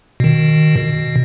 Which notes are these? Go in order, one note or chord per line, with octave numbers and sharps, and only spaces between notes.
B2 D#3
B2